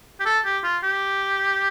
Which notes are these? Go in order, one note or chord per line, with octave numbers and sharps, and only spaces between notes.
G4
A4
G4
F4
G4